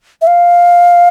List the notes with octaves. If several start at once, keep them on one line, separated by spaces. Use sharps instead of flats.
E5
F5